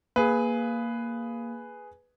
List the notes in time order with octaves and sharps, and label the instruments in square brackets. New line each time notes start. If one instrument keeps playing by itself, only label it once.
[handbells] A#3 [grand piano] G#4 B4